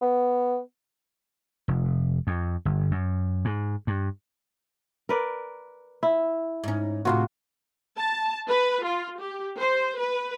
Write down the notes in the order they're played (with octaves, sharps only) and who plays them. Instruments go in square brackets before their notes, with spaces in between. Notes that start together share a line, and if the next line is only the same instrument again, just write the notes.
[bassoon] B3
[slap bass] F1
F2
G1
F#2
G#2
G2
[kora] A#4 B4 D5
E4
[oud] G#2 C#4
[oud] D2 A2 C3 [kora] F4 F#4
[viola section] A5
B4
F4
G4
C5
B4